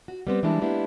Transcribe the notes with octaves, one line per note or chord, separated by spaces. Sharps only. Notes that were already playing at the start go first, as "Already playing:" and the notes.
F#4
G3 B3 C4
E3 G3 G#3 A#3 D4 E4
G#3 A#3 B3 D4 E4 G4